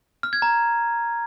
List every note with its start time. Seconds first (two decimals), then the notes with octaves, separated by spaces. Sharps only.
0.23 F6
0.33 G#6
0.42 A#5